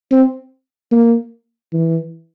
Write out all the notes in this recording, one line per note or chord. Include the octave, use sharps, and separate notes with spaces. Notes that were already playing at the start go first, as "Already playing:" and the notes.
C4
A#3
E3